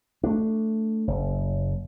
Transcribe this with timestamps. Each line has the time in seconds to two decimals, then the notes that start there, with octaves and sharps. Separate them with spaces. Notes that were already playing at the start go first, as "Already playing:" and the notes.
0.24 A3 D4
1.07 F#1